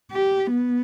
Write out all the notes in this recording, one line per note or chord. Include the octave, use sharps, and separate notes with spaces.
G4
B3